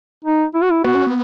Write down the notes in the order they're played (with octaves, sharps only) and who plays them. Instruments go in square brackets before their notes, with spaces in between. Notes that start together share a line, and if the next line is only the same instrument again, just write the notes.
[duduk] D#4
E4
F#4
E4
[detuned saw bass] B3 [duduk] F#4
[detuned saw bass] C#4
B3